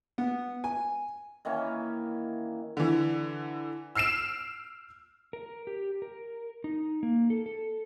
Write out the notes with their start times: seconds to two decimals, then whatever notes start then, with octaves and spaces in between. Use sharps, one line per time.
0.18 B3
0.64 G#5
1.45 D#3 E3 A#3 C#4
2.77 D3 E3
3.95 E6 F6 C7 D7 E7
5.33 A#4
5.67 G4
6.02 A#4
6.64 D#4
7.03 A#3
7.30 A4
7.46 A4